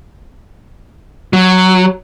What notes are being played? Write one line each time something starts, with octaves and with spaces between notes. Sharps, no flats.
F#3